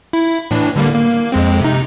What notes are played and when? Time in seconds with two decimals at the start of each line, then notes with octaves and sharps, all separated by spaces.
0.13 E4
0.51 A2 E3 D4
0.76 D3 G3 A#3
0.94 A#3
1.32 F2 G#3 C4
1.61 C3 D#4